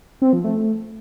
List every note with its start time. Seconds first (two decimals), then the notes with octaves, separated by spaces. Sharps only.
0.22 C4
0.33 F3
0.44 A3